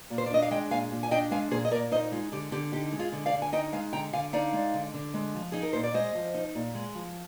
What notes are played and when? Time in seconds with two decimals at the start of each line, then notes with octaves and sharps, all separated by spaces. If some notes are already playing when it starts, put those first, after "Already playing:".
0.10 A#2
0.18 C5
0.26 D5
0.31 D4 D#5
0.42 F5
0.51 G#3 D#5 G5
0.71 A#2 F5 G#5
0.91 A#2
1.03 G#5
1.11 D4 D#5 G5
1.31 G#3 F5 G#5
1.51 A#2 G#4 C5
1.65 D#5
1.71 A#2 A#4 D5
1.91 D#4 C5 D#5
2.12 G#3 F4
2.32 D3 G4
2.52 D3 G4
2.72 D#4 G4
2.93 G#3
2.99 F4 G#4
3.12 D3
3.26 D5 F5
3.33 D3
3.42 G#5
3.52 D#4 D#5 G5
3.73 G#3 F5 G#5
3.93 D3 G5 A#5
4.13 D3 F5 G#5
4.33 D#4 D5 F5
4.53 G#3
4.74 D3
4.94 D3
5.14 G#3
5.35 F3
5.52 D#4 G#4
5.62 A#4
5.73 A#2 C5
5.84 D5
5.94 G#3 C5 D#5
6.15 F3
6.34 D#4
6.55 A#2
6.75 G#3
6.95 F3